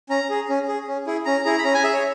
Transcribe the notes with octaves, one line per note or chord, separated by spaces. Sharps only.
C#4 A#5
G#4
C#4
G#4
C#4
E4 G#4
C#4 A#5
E4 G#4 A#5
B5
C#4 A#5
G#5
G#4 E5
C#5